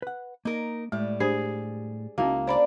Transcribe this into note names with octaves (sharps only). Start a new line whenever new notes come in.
B4 F#5
A#3 D#4 A#4
A2 G3 G#3
D4 G4 G#4 C5
C#2 A#3 C#4 D#4 E4 F#4
D4 C5 D5 A#5 B5